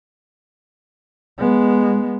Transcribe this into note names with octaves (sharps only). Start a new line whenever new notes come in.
G#3 B3